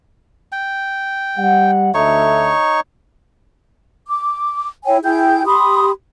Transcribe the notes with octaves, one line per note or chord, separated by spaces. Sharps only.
G5
G3 F#5
D2 D#4 A4 C#5 E5 C#6
D6
E4 C#5 G5 G#5
E4 G#4 G5 G6
G4 B5 C6 D#6